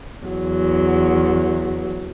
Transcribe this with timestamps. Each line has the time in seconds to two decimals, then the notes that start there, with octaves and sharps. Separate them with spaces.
0.25 E2 F#3